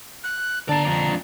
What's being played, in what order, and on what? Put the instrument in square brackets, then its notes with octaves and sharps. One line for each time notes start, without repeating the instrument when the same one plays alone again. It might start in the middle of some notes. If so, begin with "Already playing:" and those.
[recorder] F#6
[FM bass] D3 [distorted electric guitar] D5 A#5 [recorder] A5
[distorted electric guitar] F2 D4 [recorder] A#5